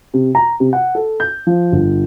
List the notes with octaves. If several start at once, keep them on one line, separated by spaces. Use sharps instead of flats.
C3
A#5
C3
F#5
A4
G6
F3
G1